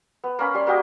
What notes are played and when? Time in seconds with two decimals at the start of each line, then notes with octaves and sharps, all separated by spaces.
0.24 B3
0.39 A#3 C#4 B5
0.54 G3 C6
0.67 A#3 F#4 G4 D#5